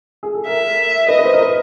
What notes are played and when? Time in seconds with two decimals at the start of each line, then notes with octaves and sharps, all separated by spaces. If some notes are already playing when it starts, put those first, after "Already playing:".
0.23 G#4
0.34 A4
0.47 A#4 E5
1.08 B4 D#5
1.19 B4
1.24 C5
1.33 A#4
1.40 B4